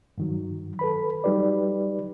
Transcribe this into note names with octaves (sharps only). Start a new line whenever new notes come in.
G2 D#3 F#3
A4 B4 B5
F#3 G3 D#4 G4 B4 D5